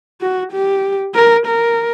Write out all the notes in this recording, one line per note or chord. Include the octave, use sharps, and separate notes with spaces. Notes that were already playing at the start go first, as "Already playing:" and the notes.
F#4
G4
A#4
A#4